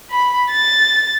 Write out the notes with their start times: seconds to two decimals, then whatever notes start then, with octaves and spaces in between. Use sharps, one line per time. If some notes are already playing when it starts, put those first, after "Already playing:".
0.11 B5
0.51 A6